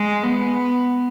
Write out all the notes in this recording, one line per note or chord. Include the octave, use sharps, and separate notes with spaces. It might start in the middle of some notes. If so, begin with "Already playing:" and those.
Already playing: G#3
B3